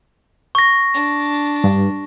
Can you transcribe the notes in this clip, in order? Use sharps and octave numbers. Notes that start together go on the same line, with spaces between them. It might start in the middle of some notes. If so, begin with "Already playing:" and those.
C#6 A#6
D4
G2